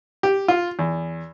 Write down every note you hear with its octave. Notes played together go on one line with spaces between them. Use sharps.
G4
F4
E2